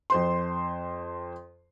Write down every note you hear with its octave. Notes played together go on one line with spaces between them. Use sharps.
F2 C5 C6